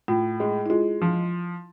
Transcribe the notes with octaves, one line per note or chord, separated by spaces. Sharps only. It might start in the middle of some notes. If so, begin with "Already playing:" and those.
A2 F4
G#3
E4
G#3 F4
F3